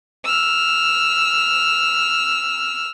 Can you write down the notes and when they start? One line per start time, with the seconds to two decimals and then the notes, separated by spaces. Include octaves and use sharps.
0.25 E6 F6